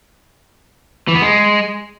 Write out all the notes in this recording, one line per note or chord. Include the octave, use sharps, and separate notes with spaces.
E3
B3
G#3